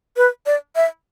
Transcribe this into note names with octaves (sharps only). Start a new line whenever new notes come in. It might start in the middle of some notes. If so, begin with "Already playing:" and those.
B4
D5
E5